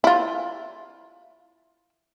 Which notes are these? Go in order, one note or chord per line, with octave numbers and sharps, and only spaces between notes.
E4 F4